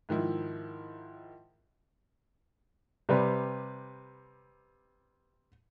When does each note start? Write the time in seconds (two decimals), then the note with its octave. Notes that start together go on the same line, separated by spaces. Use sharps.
0.09 G#2 D#3 F3 E4
3.09 C3 G3 B4